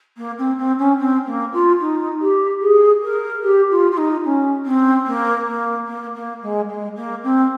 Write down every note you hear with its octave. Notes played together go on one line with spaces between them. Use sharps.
A#3
C4
C4
C#4
C4
A#3
F4
D#4
G4
G#4
A#4
G4
F4
F4
D#4
C#4
C4
A#3
A#3
A#3
A#3
G#3
G#3
A#3
C4